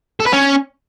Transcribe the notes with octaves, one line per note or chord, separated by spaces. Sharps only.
A4
B4
C#4